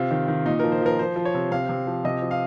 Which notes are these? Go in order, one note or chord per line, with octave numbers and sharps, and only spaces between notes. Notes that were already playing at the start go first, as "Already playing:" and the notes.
Already playing: C3 F4
D#3
D#3
A#2 D#4
F3 A#4
C5
F3 A#4
F3 C5
F3
C#5
C3
C3 F5
C3
F3
C3 D#5
F3
F5